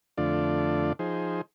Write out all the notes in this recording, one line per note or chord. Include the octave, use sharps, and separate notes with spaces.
F2 D3 A3 D4 F4 D5
F3 D#4 G#4 C5